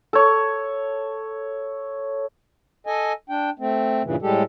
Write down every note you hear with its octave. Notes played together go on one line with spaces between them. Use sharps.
A4 C#5
A4 D#5 G#5
D4 G5
A3 C4
G2 A#2 C#3 E3
A2 G3 G#3 G4 A4